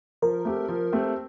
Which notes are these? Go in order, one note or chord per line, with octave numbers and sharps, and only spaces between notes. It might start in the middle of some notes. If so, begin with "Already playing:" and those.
F3 A#4
A3 C4 G4
F3
A3 C4 G4